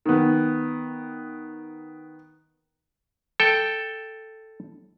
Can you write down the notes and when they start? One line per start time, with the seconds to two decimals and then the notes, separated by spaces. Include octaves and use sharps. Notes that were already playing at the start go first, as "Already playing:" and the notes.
0.06 D#3 B3
3.40 A4 G5